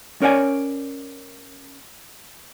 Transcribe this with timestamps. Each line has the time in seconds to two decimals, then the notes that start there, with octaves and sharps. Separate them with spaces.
0.22 C#4 A#4 C#5 D5 F#5 G#5